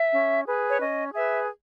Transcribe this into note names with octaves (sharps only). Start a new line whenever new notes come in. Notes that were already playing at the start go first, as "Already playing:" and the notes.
Already playing: E5
C#4
G#4 B4
C#5
C#4 D#5
G#4 B4 E5